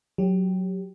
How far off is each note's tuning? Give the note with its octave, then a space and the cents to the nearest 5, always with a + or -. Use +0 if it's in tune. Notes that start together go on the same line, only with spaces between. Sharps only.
F#3 +0 G4 +0